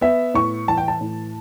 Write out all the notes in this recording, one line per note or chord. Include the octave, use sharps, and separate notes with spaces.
B3 E5
A2 C#6
E3 A5
G5
A5
A2